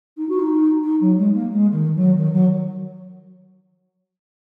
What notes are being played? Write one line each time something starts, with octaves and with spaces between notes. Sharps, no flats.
D#4
F#4
D#4
D#4
F#3
G#3
A#3
G#3
D#3
F#3
D#3
F#3